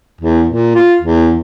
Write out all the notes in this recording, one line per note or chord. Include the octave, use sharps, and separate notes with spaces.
E2
A#2
F4
E2